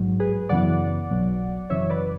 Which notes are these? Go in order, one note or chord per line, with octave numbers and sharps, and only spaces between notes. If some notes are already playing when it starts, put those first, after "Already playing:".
Already playing: A1 G#2 F#3
G#4 B4
F#2 C#3 E3 B3 D5 F#5
B1 B2 F#3
F#2 C#3 E3 C#5 E5
B4 D5